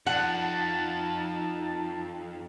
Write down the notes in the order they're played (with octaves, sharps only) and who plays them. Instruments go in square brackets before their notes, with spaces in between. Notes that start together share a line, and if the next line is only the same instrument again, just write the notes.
[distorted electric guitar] F2 [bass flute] D#4 [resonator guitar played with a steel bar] F#5 [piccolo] A5